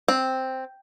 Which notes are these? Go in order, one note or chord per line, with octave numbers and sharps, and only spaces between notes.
C4